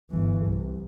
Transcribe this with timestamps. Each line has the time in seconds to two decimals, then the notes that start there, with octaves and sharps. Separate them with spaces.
0.10 G1 E3
0.46 C2